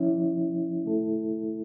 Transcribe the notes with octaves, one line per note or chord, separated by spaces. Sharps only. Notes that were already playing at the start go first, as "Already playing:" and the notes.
Already playing: F3 C#4 E4
A3 E4 A4